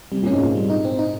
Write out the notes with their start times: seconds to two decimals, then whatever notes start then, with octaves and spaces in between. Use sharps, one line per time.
0.12 C3 G3
0.22 A#2 C#4
0.33 G#2
0.41 A#2 F4
0.55 G3
0.70 D#4
0.85 C4
0.99 D#4